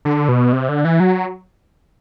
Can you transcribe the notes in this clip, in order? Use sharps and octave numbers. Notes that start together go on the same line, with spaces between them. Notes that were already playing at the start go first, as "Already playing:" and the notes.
D3
B2
C3
D3
E3
F#3